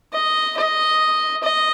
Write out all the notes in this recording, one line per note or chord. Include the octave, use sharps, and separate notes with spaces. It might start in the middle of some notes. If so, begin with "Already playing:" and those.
D#5
D#5
D#5